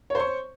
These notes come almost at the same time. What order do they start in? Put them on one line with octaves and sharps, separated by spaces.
C#5 C5 C#6